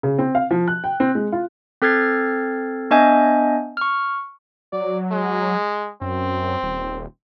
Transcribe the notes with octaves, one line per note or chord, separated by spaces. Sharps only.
C#3
C4
F5
F3
F#6
G5
C4
G#3
F4
C4 A4 F6 G#6 A6 C7
B3 D4 D#5 E5 G#5 G6
C#6 F6
F#3 D5
G#3
F#2 C4
D#1